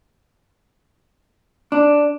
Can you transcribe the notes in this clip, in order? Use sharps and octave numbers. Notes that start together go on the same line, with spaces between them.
D4